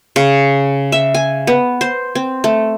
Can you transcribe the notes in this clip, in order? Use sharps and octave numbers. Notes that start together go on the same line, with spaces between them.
C#3
E5
G#5
B3
C5
C4
A3